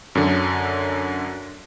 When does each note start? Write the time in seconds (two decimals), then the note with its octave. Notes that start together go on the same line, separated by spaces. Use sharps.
0.15 F#2 D3